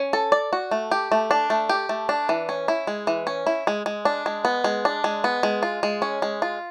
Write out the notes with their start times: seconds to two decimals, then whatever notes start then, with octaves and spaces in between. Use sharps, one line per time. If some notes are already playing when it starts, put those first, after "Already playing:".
Already playing: C#4
0.13 A4
0.32 D5
0.53 F#4
0.71 A3
0.91 G4
1.12 A3
1.31 D4
1.50 A3
1.69 G4
1.89 A3
2.09 D4
2.29 E3
2.49 C#4
2.68 E4
2.87 G#3
3.07 E3
3.27 C#4
3.47 E4
3.67 G#3
3.86 G#3
4.05 D4
4.26 G#3
4.45 B3
4.64 G#3
4.85 D4
5.04 G#3
5.24 B3
5.43 G#3
5.63 F4
5.83 G#3
6.02 C#4
6.22 G#3
6.42 F4